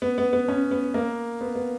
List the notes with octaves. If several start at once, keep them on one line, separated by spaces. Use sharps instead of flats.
B3
B3
B3
C#4
B3
A#3
B3
B3